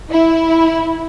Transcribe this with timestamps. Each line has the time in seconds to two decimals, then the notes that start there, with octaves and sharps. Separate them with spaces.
0.11 E4